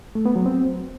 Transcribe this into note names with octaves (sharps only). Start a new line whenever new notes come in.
A3
B3
F#3
C4